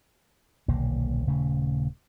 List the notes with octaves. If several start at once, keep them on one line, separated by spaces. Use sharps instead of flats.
D#1 B1 D3 A#3
D#1 C#3 A3